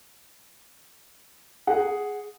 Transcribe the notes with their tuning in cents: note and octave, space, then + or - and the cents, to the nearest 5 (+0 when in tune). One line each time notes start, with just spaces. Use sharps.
G#4 +0 F#5 +0